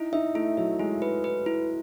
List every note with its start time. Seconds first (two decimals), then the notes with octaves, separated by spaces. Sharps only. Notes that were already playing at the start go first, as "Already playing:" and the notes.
Already playing: D#4 E4
0.12 D#4 E5
0.35 A3 E4
0.57 F#3 E5
0.79 G#3 E4
1.02 B4
1.24 B4
1.46 E4